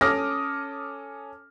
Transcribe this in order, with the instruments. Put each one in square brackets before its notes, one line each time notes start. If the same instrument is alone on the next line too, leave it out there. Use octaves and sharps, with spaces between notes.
[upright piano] C#4 A4 D6 D#6 F6 A#6